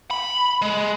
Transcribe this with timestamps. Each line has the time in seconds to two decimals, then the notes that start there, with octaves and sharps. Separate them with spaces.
0.11 B5
0.62 G#3